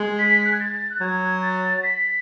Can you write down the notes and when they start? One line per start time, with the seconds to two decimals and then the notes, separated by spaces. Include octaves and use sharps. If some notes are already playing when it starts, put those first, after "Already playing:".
Already playing: G#3
0.19 B6
0.45 F#6
0.52 G#6
0.60 A6
0.90 F#6
1.00 F#3 G#6
1.42 A6
1.77 A6
1.83 B6